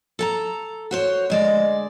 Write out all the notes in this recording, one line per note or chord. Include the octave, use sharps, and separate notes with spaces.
A4 G#5 A#5
F#4 C5 C#5
D2 G#3 D5 D#5